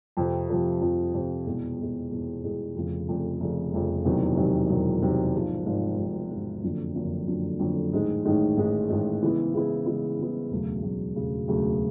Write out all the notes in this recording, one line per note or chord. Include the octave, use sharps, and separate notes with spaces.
F2 C3 F3
F2 C3 F3
F2 C3 F3
F2 C3 F3
E2 B2 G#3
E2 B2 G#3
E2 B2 G#3
E2 B2 G#3
F1 F2 C#3
F1 F2 C#3
F1 F2 C#3
F1 F2 C#3
E1 E2 C3 D#3 F#3
E1 E2 C3 D#3 F#3
E1 E2 C3 D#3 F#3
E1 E2 C3 D#3 F#3
G#1 G#2 F3
G#1 G#2 F3
G#1 G#2 F3
G#1 G#2 F3
F#1 F2 D3 F#3
F#1 F2 D3 F#3
F#1 F2 D3 F#3
F#1 F2 D3 F#3
A1 G#2 D#3 G#3
A1 G#2 D#3 G#3
A1 G#2 D#3 G#3
A1 G#2 D#3 G#3
C#3 E3 G#3 B3 E4
C#3 E3 G#3 B3 E4
C#3 E3 G#3 B3 E4
C#3 E3 G#3 B3 E4
E1 D2 C#3 F#3
E1 D2 C#3 F#3
E1 D2 C#3 F#3
E1 D2 C#3 F#3